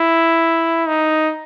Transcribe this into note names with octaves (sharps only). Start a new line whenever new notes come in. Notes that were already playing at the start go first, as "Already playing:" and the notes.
Already playing: E4
D#4